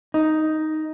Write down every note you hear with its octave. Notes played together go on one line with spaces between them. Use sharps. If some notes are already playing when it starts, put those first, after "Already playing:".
D#4